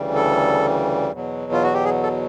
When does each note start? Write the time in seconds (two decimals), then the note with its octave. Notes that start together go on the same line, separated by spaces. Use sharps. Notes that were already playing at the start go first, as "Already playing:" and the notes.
Already playing: D2 C#3 E3 G3
0.15 A4
1.12 E2 B2 F#3
1.52 F4
1.63 F#4
1.74 G4
1.85 G#4
2.03 A4